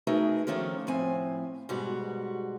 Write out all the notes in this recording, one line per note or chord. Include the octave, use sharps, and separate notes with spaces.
A3 D#4 F#4 G#4 A#4 B4
D#3 F3 A3 C#4 D4 A#4
A2 F3 C4 G#5
G#2 B2 G3 F#4